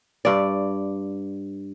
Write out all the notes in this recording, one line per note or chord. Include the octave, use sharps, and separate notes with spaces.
G2 D5